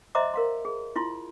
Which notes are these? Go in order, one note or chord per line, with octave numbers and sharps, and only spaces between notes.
C5 D#5 E5 A#5 C6 D6
A#4 F5 C6
G#4
E4 F4 C6